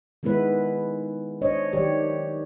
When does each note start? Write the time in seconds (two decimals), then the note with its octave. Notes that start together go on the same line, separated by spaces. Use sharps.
0.23 D#3 G#3 B3 E4 B4
1.42 D4 C5 C#5 D#5
1.73 D#3 F#3 G4 C#5 D5